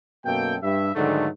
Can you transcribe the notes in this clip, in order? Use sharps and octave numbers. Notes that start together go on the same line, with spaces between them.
F#2 B2 A#3 A4 G5
G2 E5
G#2 D3 D#3 F#3 G#3 A3